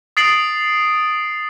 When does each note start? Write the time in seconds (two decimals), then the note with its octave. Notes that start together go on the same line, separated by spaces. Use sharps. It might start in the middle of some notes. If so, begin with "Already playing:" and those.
0.17 D#6 A6 C7 D7 F#7